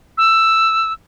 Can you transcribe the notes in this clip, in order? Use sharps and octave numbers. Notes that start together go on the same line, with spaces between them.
E6